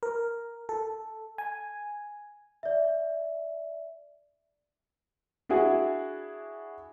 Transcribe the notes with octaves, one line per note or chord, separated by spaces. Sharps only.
A#4
A4
G#5
D5 E5
D4 E4 F#4 G#4